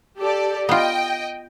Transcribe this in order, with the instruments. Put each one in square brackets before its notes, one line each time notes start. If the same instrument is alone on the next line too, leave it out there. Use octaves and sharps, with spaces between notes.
[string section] G4 A4 D5
[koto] B3 F4 [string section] D#5 G5